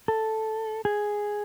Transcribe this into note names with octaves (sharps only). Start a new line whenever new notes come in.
A4
G#4